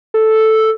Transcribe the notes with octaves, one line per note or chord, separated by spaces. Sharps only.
A4